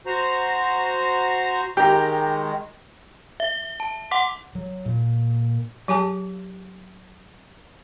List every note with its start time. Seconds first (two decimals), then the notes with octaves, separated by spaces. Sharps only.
0.06 F#4 C5 A#5
1.77 D#3 G#3 G4 A#5
3.40 E5
3.80 A5
4.11 F#5 C6 D6 B6
4.55 F#3
4.86 A#2
5.88 F#3 G4 G#5 A5